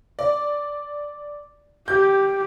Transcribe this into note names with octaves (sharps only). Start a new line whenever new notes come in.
D5
G4 G6